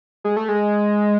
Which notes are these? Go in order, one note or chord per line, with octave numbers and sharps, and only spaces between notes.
G#3
A3
G#3